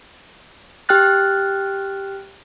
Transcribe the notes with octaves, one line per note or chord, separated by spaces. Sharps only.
G4 G5 F6 F#6 A6